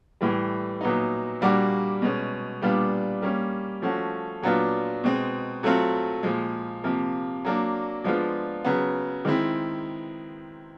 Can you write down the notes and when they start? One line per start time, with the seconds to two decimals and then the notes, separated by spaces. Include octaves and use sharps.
0.21 A2 E3 G3
0.81 A#2 F#3 B3 D#4
1.41 A#2 G3 A#3 D4 F#4
2.02 B2 G#3 C#4
2.62 A#2 G3 B3 D4 F4
3.22 G3 A#3 C#4
3.82 F3 A3 C#4 F#4
4.43 A#2 F#3 B3 D4 F4
5.04 B2 G#3 C4
5.63 F#3 A3 C4 F4
6.23 A#2 F3 G#3
6.84 C3 F3 A#3
7.45 F#3 A#3 D4
8.04 F3 G#3 B3 D4 F4
8.65 C#3 F#3 B3
9.25 D#3 G#3 C4 E4